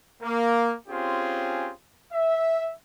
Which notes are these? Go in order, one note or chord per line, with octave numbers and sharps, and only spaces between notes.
A#3
C4 C#4 F4 G4 G#4
E5